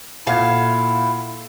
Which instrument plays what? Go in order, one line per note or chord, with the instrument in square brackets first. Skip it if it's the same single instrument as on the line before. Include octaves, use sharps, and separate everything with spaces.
[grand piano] A#2 F#5 G#6 [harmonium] E4 [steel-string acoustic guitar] A4 F5